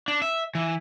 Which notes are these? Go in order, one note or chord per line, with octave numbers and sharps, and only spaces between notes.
D4
E5
E3